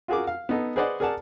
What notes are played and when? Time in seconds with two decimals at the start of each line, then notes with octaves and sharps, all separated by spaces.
0.08 F4 F#4 G#4 A#4 D6
0.27 F5
0.49 B3 D#4 A4
0.76 G#4 B4 C5 D5 D#5 F#5
1.00 G#4 A#4 D5 F#5 A5